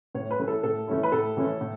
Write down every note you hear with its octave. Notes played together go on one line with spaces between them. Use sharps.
A2 C#5
B4
E3 A3 C#4 E4
A4
A2 A4
E3 A3 C#4 E4
B4
A2 A4
E3 A3 C#4 E4
A2